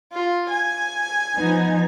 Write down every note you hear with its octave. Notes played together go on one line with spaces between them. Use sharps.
F4
G#5
F3 B3 D#4